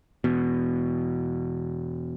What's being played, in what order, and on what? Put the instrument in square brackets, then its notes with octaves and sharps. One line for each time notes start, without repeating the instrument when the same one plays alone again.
[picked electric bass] E2 B2